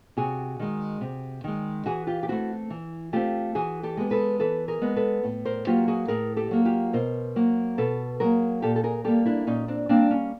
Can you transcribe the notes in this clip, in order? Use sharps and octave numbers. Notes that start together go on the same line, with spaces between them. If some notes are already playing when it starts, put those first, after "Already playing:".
C3 F#4 G#4
D#3 G#3
C3
D#3 G#3
E3 F#4 G#4
F4 G4
G4
A3 C4 E4 F#4
E3
A3 C4 F4 G4
E3 F#4 G#4
G4 A4
G#3 B3
A4 B4
E3 A4 B4
G#4 A#4
G#3 B3
A4 B4
A2
A#4 C5
F#3 A#3 F4 G4
F#4 G#4
A2 G#4 A#4
G4 A4
F#3 A#3
F4 G4
B2 A#4 C5
F#3 A#3
B2 A4 B4
F#3 A#3 G#4 A#4
A#2 G4 A4
A4
G#4 A#4
G3 A#3 G4 A4
D4 E4
A#2 C#4 D#4
C4 D4
G3 A#3 C4 D4
C#4